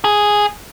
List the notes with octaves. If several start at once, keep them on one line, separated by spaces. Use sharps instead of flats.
G#4